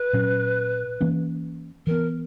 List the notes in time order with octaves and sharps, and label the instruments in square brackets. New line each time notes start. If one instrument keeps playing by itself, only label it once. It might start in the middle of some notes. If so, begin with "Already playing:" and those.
Already playing: [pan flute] B4
[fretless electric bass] A#2 F#3 C#4
E3 A#3 C#4
[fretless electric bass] E3 B3 [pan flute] A#4